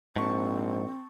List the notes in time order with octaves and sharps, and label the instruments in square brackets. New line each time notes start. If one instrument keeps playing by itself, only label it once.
[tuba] A#1 [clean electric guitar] G#2 [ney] C4 [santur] A5 C#6